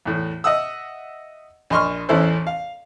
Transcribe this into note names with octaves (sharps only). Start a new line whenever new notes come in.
E2 A2
D#5 E5 F#5 D#6 E6
A#1 D#5 C6 C#6 F6
A1 E2 C#4 E4 A4 C5
F5